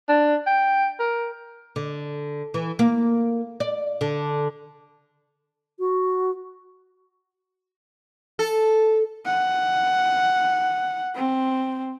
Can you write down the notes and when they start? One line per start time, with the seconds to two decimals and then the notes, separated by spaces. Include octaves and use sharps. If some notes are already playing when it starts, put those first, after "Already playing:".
0.09 D4
0.46 G5
0.99 A#4
1.76 D3
2.54 E3
2.79 A#3
3.60 D5
4.01 D3
5.79 F#4
8.39 A4
9.25 F#5
11.15 C4